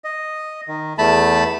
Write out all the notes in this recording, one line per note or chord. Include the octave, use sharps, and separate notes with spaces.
D#5
D#3
E2 A3 A5 B5